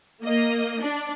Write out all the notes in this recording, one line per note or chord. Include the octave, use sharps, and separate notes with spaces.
A#3 D#5
D4